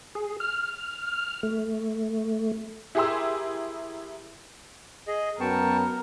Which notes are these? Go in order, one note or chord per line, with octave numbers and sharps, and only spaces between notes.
G#4
F6
A3
E4 G4 G#4 A#4 C6 E6
G#4 D#5
F#2 B3 A#4 G5 A5 C#6